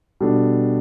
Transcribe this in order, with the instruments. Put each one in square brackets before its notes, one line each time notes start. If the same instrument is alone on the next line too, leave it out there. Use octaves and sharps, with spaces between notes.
[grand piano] B2 G3 D4 A4